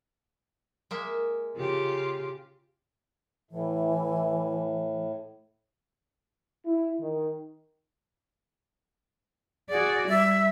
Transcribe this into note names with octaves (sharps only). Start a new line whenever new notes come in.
G#3 A#3 E5
C#3 F4 G4
A2 E3
E4
D#3
F#4 G#4 D5
G3 E5